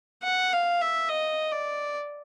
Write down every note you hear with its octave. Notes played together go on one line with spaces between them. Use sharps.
F#5
F5
E5
D#5
D5